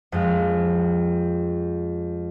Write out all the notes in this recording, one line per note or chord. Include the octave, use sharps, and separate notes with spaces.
F2 G#3 F5